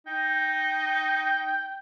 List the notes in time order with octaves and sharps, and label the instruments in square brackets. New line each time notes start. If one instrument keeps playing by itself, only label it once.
[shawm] D#4 [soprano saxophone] G5